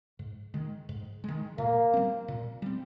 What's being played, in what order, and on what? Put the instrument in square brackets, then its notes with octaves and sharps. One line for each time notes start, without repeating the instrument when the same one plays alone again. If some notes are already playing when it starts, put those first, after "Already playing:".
[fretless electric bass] G#2
D#3 G#3
G#2
D#3 G#3
[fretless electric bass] A#2 [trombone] A#3
[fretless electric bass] G3 C4
A#2
G3 C4